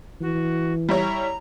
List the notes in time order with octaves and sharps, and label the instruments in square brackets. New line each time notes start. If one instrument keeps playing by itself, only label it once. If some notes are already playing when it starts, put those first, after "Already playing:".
[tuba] E3 [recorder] F#4
[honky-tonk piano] G3 E4 C#5 [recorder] A#5